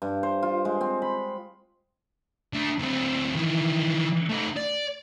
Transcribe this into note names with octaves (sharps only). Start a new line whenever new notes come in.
G2
C5
F4
G#3
C4
B5
D3 A3
D2 C4
D#3 E3
A3 D#4
D5